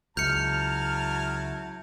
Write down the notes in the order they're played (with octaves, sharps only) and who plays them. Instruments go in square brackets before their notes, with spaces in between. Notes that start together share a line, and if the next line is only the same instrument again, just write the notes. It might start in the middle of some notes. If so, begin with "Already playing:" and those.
[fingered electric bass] C#2 [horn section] F#3 E4 A5 [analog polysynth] F6 [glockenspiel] G6 C#7